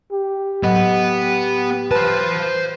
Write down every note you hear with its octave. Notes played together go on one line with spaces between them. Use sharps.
G4
A2 F#3 B3 D#5
B4 C5 A5